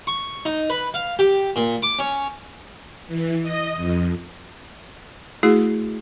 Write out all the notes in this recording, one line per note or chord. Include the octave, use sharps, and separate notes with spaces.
C#6
D#4
B4
F5
G4
A#2
D6
C#4
E3
D#5
F2
A3 E4 F#4 G#4